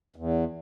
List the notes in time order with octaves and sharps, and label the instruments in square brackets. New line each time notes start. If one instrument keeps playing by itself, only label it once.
[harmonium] E2